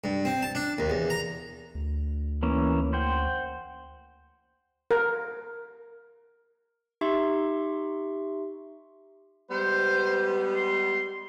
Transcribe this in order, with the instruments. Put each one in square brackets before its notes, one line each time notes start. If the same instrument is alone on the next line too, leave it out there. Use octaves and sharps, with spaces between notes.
[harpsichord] G2
C4
A5
D4
D#2
E2
A#5
[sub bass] D2
[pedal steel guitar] E3 A#3 C#4
C5 F#5 G5
[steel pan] A#4
[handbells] D#4 G4 E5 C6 C#6
[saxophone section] G3 G#3 B3 [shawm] C5
[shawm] C6